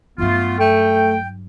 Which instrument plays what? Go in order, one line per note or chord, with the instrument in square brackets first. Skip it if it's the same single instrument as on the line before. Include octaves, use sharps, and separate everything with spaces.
[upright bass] G2 F#3 [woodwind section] A3 B3 F4
[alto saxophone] A3 [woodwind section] G5